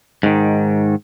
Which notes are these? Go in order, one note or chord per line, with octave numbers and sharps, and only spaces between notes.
G#2 D#3